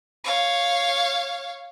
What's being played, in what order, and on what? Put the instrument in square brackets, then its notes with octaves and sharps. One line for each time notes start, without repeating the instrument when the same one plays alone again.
[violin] C#5 F5